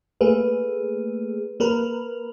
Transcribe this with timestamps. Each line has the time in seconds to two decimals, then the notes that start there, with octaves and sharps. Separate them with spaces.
0.21 A3 A#3 G#4 B4
1.60 A#3 A#4 B4